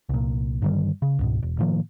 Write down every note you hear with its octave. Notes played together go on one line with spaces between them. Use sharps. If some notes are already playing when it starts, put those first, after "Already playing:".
C2 A#2
G2 D3 D#3 G3
C#3
C#2 G#2 B2
E1
A2 D#3 F3 A#3